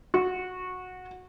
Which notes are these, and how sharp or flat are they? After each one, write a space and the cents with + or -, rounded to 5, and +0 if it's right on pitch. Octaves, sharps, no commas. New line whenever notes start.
F#4 -15